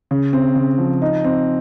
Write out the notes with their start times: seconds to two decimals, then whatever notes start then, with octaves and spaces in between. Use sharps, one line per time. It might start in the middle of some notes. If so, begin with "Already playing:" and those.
0.11 C#3
0.33 C4
0.55 C#3
0.78 F3
1.02 D#4
1.24 C4